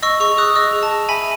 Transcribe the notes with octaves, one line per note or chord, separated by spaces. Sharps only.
D#5 C#6 E6
G#4 C#6 E6
G#4 D#6 F#6
D#5 C#6 E6
G#4
A5
G#4
E5 G#5 B5